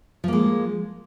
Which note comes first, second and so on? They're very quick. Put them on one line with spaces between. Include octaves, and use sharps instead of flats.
F3 A#3 G#3